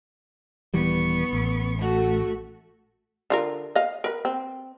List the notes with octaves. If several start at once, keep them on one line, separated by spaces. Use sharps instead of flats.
D#1 E3 G3 B3 C#6
A1
A3 F#4 A4
D3 F4 A#4
D#5 F5
A#4 B4
C4